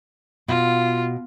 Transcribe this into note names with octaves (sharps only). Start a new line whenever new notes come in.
B2 F4